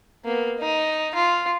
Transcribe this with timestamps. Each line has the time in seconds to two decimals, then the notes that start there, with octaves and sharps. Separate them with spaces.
0.25 A#3 B3
0.58 D#4
1.15 F4